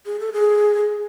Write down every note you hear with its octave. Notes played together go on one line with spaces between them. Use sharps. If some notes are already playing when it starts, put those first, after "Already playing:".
G#4
A4
G#4